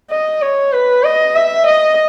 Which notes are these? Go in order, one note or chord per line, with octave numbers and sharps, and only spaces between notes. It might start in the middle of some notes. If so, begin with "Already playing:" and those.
D#5
C#5
B4
D#5
E5
D#5